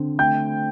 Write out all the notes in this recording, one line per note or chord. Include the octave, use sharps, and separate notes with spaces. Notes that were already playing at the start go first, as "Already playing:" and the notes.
Already playing: D3 C4
A3 G5 G6